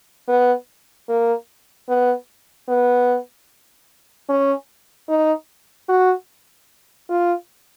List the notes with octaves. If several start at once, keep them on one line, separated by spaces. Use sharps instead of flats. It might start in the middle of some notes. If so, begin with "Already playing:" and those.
B3
A#3
B3
B3
C#4
D#4
F#4
F4